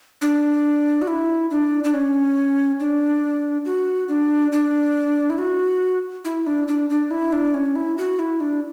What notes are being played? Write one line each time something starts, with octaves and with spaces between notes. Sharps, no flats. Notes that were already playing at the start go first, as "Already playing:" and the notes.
D4
F#4
E4
D4
D4
C#4
D4
F#4
D4
D4
E4
F#4
E4
D4
D4
D4
E4
D4
C#4
E4
F#4
E4
D4